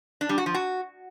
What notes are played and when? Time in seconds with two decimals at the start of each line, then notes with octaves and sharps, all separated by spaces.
0.21 D4
0.29 G3
0.38 F#4
0.46 F3
0.54 F#4